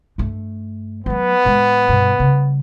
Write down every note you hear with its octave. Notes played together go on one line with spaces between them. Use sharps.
G2 A3
F#3 A3 B3
A2 G#3
G2 B2
C#3 G3